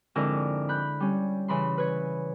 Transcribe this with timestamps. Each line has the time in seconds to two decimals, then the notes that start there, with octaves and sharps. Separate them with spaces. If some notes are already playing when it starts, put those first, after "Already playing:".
0.15 F2 G#2 D3 E4 A#4 D6
0.69 B5 F#6 G6
1.00 G3 C#4
1.48 C#3 E3 B5 C6
1.78 B4 C#5